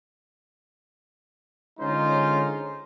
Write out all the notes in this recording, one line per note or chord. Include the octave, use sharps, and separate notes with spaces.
D3 G#3 C#4 D#4 F4 C5